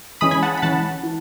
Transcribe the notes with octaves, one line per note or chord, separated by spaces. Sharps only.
E3 G#3 C#4 B5 D#6
G#5 B5
F#5 A5
B5
E3 G#3 C#4 F#5 A5
E3